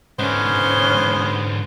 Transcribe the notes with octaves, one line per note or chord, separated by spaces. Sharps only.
G#2 D3 B3 C#4 C5